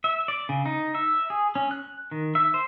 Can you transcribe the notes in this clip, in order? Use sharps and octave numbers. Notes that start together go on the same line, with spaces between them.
E5
D5
C#3
D#4
E5
G#4
C#4
F#6
D#3
E5
C5